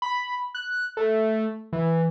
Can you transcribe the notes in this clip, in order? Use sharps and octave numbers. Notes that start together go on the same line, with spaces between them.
B5
F#6
A3
E3